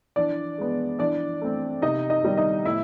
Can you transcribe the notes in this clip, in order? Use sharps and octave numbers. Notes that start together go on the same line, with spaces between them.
E3 D4 D5
G#3 B3
E3 D4 D5
A3 C4
C3 D#4 D#5
D#4 D#5
D#3 G3
D#4 D#5
A2 E4 E5